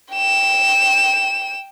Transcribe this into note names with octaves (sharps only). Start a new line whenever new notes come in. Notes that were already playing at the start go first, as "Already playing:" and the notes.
G5 E7